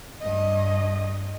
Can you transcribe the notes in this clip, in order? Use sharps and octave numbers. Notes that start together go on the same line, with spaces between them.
G2 D#5